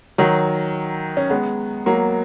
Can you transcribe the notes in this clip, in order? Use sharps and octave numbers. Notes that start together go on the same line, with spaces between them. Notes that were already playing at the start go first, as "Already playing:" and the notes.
D#3 F#3
C#4
G#3 B3
F#3 A#3